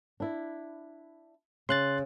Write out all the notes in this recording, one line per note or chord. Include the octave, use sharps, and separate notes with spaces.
D4 E4
C#3 C6 F#6 A6